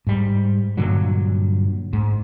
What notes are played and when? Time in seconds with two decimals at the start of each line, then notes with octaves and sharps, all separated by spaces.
0.07 G#2 G3
0.77 G2 A#2 D3 F#3
1.93 G#2